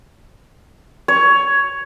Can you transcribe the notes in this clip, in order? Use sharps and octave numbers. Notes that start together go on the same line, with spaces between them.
C#5